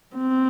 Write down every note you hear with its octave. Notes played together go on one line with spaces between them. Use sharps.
C4